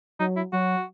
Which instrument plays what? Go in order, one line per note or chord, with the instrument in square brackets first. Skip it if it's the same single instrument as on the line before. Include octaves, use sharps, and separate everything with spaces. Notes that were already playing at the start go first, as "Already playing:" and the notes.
[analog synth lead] F#3 [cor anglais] D#4
[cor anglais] E4
[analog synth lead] F#3 [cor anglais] F#4